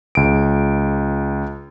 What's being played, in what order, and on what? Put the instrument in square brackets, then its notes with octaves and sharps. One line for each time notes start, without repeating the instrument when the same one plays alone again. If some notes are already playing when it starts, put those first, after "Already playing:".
[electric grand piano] C#2 D7